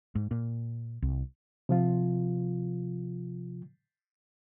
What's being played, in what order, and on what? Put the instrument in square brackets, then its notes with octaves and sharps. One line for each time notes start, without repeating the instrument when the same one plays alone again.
[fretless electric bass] G#2
A#2
C2
[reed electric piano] C3 F3 F4